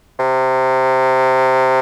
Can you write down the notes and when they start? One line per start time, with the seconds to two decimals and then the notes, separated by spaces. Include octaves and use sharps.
0.19 C3